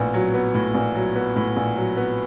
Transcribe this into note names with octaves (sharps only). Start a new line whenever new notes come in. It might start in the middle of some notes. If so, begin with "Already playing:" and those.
Already playing: A#1 A2 B3
F#3
B3
A2
A#1
F#3
B3
A2
A#1
F#3
B3